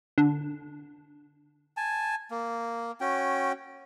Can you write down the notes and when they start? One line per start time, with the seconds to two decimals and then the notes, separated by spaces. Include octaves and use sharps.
0.18 D3
1.77 G#5 A5
2.31 A#3
3.01 C#4 F#4 G5